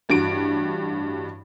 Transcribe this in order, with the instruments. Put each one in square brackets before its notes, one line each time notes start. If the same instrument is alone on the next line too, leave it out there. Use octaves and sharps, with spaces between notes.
[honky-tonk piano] A1 G2 F#4 D7